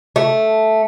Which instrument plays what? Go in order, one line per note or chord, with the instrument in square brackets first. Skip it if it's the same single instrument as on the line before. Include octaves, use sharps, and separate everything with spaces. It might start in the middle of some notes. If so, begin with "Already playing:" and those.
[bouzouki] A3